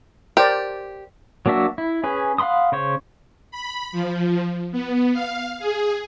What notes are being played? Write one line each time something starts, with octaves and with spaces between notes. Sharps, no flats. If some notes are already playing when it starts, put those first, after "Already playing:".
G4 A#4 C5 D5
F#3 A#3 D4 F#4 E5
E4
C#4 G#4 B4
F5 F#5 B5 C6 D#6
C#3 C5 C#5
B5
F3
B3
F5
G#4